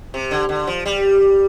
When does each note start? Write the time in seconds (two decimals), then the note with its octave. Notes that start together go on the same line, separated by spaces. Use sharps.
0.14 C3
0.31 D3
0.49 D3
0.67 F3
0.86 G3